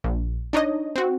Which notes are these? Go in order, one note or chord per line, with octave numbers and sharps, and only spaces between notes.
A#1
D4 D#4 C#5 D#5
C4 F#4